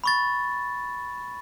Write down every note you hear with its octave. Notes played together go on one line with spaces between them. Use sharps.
B5 C#6 A6